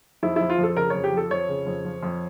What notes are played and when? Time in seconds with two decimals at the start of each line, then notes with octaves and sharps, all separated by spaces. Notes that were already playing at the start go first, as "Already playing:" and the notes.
0.23 F2 E4
0.36 F3 E4
0.49 F4
0.59 F2 A4
0.76 C#3 A#4
0.90 F2 C#5
1.04 G4
1.13 F3 A4
1.31 F2 C#5
1.49 C#3
1.67 F2
1.85 F3
2.03 F2